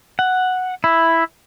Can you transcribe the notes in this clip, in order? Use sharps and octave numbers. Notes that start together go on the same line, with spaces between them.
F#5
E4